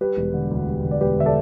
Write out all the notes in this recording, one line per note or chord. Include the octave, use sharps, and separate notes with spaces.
G3 G4 B4
E1
D3
D2
G3
D2
D5
E1 G4 B4
D3 E5
A4 D5